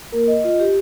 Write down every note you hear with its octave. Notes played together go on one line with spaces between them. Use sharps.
A#3 A#4
D#5
F4 D#5
G4